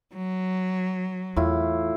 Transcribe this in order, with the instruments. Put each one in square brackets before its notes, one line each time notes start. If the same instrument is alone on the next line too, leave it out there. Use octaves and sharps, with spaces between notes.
[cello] F#3
[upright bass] E2 [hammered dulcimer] A2 E4 F4